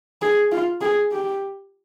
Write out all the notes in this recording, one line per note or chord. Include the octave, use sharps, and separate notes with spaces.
G#4
F4
G#4
G4